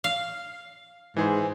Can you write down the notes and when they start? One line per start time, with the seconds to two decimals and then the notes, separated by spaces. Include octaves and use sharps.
0.04 F5
1.17 G#2 E3 G#4 C5